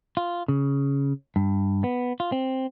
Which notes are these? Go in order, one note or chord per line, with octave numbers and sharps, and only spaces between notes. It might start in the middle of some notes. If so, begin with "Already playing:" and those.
F4
C#3
G2
B3
F4
C4